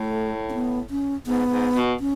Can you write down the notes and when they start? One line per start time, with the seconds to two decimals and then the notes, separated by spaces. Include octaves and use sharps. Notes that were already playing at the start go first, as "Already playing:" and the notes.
Already playing: A2 A3
0.49 C#4
0.54 B3
0.90 C#4
1.27 G#2 B3
1.52 G#2
1.76 B2
2.00 C#4